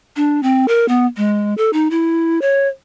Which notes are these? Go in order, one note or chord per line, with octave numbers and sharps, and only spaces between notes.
D4
C4
A#4
B3
G#3
A4
D#4
E4
C#5